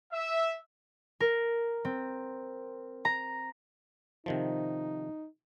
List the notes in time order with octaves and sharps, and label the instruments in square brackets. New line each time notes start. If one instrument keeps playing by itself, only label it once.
[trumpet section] E5
[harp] A#4
C4
A#5
[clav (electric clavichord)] C3 D#3 F3 [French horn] D#4